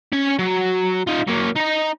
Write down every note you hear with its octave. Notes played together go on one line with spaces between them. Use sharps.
C#4 G#5
F#3
D#4 F4
F#3 A#3
D#4 A#5